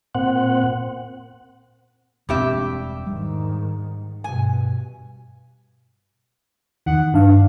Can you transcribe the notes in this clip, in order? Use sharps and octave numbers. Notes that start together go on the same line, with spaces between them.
A#2 C4 F#5
E1 G2 C4 G4 E5
G#2 D#3 G3
G2 B2 G#5
E2 D#3 F#5
G2 D4 F5